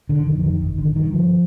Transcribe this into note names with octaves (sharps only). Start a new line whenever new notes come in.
D3
F2 D3 D#3
D#3
G1 D#3
D3
G2 D3 D#3
F3